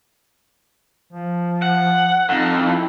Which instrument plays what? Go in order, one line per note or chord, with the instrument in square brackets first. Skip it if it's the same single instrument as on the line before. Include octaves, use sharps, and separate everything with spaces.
[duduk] F3
[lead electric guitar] F#5
[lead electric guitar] F2 [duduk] D#4
[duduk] E4